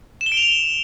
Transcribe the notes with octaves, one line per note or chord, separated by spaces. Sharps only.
E7
G7
D7
F7
G7